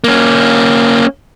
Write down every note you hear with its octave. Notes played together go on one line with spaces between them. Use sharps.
A#3 C#4